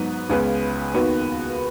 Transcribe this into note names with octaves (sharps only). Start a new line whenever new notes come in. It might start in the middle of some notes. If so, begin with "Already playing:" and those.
Already playing: G#2 F#3 B3 D#4
C#2 C#3 B3 G#4 B4
D#2 D#3 B3 F#4 B4